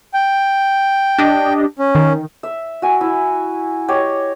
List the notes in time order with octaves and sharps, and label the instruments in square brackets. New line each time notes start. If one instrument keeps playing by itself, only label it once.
[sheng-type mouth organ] G5
[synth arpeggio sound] D4 G4 D#5
[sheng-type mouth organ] C#4
[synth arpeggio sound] D#3
[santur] E5
F#4 G#5
E4
G4 C#5 D#5 G5